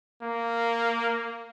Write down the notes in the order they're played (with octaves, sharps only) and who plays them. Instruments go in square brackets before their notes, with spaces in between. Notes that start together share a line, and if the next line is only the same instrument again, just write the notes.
[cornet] A#3